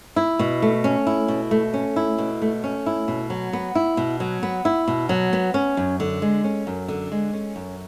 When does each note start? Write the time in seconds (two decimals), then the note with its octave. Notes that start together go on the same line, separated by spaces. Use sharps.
0.16 E4
0.39 B2
0.62 A3
0.84 C#4
1.07 E4
1.28 B2
1.51 A3
1.74 C#4
1.96 E4
2.19 B2
2.42 A3
2.64 C#4
2.86 E4
3.08 B2
3.30 F#3
3.53 B3
3.75 E4
3.97 B2
4.20 F#3
4.43 B3
4.65 E4
4.88 B2
5.09 F#3
5.33 B3
5.54 C#4
5.77 F#2
6.00 D3
6.22 G#3
6.44 C#4
6.67 F#2
6.89 D3
7.12 G#3
7.33 C#4
7.56 F#2